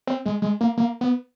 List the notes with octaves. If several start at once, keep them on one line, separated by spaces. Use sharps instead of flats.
C4
G#3
G#3
A#3
A#3
B3